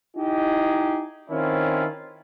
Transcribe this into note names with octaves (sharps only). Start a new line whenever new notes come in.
D#4 E4 G4 G#4 D#5
D#3 C4 C#4 E4 F4